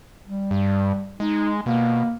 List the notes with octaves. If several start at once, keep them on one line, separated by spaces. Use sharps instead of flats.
G3
G2
G#3 D#4
B2 A#3